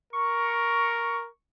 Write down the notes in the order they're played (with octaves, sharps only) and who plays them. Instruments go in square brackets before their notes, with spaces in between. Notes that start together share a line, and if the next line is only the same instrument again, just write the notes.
[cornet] A#4 [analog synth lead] C#6